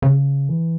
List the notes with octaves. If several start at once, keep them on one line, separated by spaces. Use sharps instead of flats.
C#3
E3